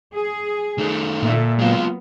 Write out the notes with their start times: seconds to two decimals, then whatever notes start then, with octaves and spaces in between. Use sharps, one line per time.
0.15 G#4
0.78 D#3 A3
1.23 A#2 A4 E5
1.59 F#3 G#3 A#3 B3 F4